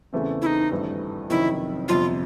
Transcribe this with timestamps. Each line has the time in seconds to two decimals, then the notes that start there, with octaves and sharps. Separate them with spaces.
0.13 E2 C#3 E3 A3 C4
0.42 E4
0.46 D#4
0.72 G#1 G2 E3 A3
1.30 F#1 F2 C3 D#3 E4
1.88 G1 F2 C3 F4